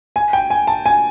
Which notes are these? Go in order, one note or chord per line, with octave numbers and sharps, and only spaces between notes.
G#5
G5
G#5
A5
G#5